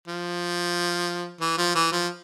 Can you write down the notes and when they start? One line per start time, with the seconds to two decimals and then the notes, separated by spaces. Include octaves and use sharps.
0.08 F3
1.41 E3
1.58 F3
1.75 E3
1.92 F3